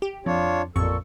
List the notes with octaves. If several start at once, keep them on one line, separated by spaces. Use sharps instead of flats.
G4
F2 D4 F4 C#5
A1 F2 A#2 A4 C#6